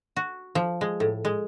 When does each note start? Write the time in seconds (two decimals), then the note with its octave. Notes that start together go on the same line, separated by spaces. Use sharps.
0.16 F#4
0.55 F3
0.81 G#3
1.00 A2
1.25 G#3